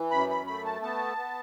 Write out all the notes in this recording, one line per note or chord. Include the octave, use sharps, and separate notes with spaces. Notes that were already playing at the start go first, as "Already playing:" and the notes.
Already playing: E3
F#2 B5
B5
A3 B5
A5
B3 A5
B3